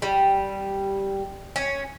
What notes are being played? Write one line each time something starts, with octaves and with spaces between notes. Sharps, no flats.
G3
C#4